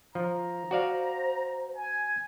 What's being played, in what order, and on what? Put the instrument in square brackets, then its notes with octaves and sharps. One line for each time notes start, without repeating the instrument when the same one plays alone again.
[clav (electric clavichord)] F3 [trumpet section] A#5
[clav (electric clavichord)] F#4 D5 F5 [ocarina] C5
[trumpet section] G#5